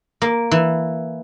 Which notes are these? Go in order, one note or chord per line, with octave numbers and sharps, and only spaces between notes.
A#3
E3